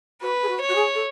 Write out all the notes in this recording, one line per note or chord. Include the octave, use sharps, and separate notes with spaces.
F#4 B4
G#4
F#4
C#5
F#4
G#4
A4